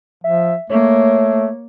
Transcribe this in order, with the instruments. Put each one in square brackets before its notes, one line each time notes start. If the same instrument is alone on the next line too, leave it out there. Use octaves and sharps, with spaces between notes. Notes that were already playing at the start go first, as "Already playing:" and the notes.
[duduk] F3 [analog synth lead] E5
[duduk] A3 [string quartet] A#3 [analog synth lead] C#5